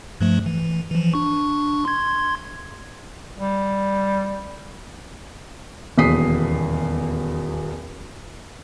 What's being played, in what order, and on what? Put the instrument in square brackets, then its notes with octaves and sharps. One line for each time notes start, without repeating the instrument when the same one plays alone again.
[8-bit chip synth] G2 F3 A3
E3
E3 F3
D4 C#6
C6 G#6
[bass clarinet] G3
[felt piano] D#1 E2 B2 D#6 B6 C7